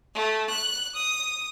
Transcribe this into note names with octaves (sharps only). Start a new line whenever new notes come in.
A3
F#6
D#6